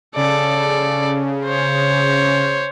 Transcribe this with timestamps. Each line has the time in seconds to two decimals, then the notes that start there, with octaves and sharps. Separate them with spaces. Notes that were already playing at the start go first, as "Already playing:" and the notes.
0.16 C#3 A4 D5
1.45 C5 C#5